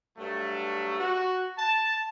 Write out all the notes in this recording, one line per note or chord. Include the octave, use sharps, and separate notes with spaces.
G2 F#3 A3
F#4
A5